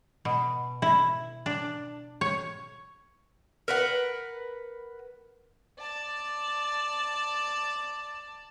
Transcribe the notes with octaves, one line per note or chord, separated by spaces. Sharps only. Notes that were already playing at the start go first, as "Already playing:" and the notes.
B2
E4
D4
C#5
A#4 B4 F#5
D5 A5